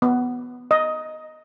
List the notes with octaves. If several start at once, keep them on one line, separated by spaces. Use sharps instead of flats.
B3
D#5